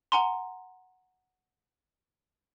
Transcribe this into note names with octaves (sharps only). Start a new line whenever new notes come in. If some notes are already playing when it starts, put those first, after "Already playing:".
F#5 G#5 A#5 C6